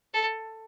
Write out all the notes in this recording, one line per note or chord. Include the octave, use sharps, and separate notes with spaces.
A4